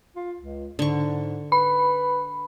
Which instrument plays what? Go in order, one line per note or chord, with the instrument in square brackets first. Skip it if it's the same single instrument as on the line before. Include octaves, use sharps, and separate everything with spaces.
[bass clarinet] F4
C#2
[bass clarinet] G#2 [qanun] D3 C#6
[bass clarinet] B4 [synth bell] B5